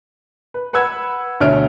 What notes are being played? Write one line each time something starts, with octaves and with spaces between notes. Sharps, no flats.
B4
B4 F#5 B5 E6 G#6
D2 B2 C#5 E5 F6 D7